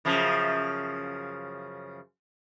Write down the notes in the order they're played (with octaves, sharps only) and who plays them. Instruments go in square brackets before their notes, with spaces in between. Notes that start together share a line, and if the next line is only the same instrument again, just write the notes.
[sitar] F#2 C#3 F3